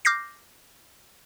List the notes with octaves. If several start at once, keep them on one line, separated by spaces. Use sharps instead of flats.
D6 F6 G6 A#6 C7